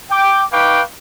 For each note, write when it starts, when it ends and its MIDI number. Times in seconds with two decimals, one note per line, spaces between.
0.11 0.43 79
0.11 0.43 86
0.51 0.81 63
0.51 0.81 71
0.51 0.81 77
0.51 0.81 79
0.51 0.81 85
0.51 0.81 86